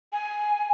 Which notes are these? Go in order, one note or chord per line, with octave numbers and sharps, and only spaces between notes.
G#5